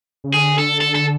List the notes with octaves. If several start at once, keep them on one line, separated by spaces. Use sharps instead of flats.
C#3
D3 G#4
A4
A4
A4